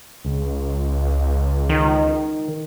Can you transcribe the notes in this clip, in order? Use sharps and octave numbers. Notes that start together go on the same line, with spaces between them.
C#2
D#3